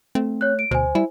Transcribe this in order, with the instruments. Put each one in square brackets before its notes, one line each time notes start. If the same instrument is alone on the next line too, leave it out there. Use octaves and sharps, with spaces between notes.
[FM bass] A3 [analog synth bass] C4
[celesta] C#5 F#6
D7
[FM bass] D2 [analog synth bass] B2 [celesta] C5 G#5
[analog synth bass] G3 [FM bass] E4